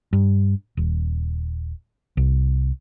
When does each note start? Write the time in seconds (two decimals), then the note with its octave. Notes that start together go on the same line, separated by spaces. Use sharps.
0.13 G2
0.77 D#1
2.17 C2